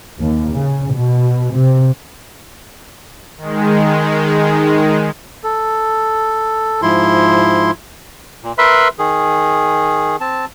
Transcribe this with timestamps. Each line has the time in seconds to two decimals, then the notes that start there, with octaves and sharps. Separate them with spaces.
0.18 D#2
0.53 C#3
0.93 B2
1.53 C3
3.38 D#3 G#3
5.44 A4
6.82 G#2 F3 E4 C6
8.44 A#2
8.58 A#4 B4 E5 B5 C6
8.99 D#3 G#4
10.20 C4 A5